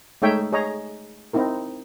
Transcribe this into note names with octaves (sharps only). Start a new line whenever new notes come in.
G#3 A3 D#4 C#5 E5 G5
G#4 C#5 D#5 A#5
C4 D#4 E4 A#4